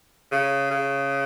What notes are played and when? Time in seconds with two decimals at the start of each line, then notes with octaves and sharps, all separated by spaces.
0.32 C#3
0.70 C#3